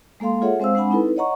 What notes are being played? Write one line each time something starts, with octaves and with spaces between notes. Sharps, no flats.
G#3 A#3 A4 F5 C6
F4 G#4 A4 C#5 E5 F#5
G#3 C4 C5 F5 E6
G#3 C4 D4 F#5 G#5 B5
C4 D#4 E4 A4 B4
C#5 D#5 F#5 A#5 C#6